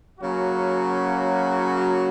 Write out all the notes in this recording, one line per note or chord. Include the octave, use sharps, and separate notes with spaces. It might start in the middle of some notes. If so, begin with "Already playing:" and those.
C#3 F#3 A#3 C#4 F#4